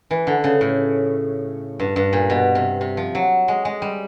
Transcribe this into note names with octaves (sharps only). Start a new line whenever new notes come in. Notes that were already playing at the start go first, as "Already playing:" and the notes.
E3
D3
C#3
A2
G2
G2
A#2
B2
C3
C3
F3
F#3
G#3
G#3
G3